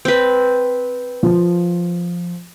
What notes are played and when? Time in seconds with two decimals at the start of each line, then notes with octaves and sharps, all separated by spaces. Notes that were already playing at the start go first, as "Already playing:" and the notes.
0.05 C4 B4
1.23 F3